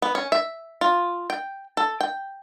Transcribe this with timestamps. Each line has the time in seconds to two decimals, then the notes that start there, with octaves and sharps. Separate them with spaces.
0.02 B3
0.15 C#4
0.32 E5
0.81 F4
1.30 G5
1.77 A4
2.01 G5